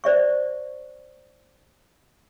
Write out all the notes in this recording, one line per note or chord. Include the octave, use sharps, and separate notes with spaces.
C5 D5 E5 C#6